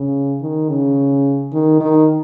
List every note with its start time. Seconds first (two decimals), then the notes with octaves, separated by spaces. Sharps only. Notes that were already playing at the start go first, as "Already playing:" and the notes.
Already playing: C#3
0.41 D#3
0.69 C#3
1.53 D#3
1.80 D#3